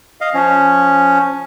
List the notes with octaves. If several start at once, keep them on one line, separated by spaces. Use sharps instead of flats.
D#5 F5
F3 C#4